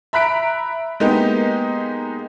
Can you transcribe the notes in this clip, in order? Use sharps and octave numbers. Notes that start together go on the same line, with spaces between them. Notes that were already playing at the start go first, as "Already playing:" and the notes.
E5 A#5 B5 F#6 B6 D7
G#3 A#3 B3 D#4 G4